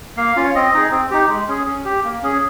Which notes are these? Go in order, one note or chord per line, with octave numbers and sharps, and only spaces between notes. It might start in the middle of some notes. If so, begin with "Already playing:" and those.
A#3 F5
C#4 F4
C#5
C4 D#5
D#4 G#4
C4
D#4 G4
G#3
C#4 G#4
C#4
G4
A#3
C#4 G#4